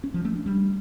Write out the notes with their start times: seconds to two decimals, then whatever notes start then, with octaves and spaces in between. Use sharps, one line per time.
0.04 C#4
0.14 F3
0.25 A3
0.35 D4
0.46 G3